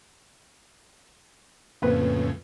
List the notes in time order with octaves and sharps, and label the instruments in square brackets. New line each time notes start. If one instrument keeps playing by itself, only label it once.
[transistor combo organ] F2 A2 C#3 [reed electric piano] A#3 C4 B4